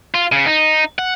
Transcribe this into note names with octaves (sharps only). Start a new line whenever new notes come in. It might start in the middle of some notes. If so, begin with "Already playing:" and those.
F4
C#3
D#4
F#5